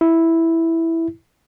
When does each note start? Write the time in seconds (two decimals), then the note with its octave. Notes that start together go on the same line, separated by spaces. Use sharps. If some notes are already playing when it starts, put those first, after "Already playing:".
0.01 E4